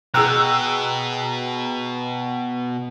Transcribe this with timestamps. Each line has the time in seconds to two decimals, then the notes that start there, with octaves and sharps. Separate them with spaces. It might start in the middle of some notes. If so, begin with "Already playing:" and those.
0.14 B2 G#4 G5 A#5 E6 F#6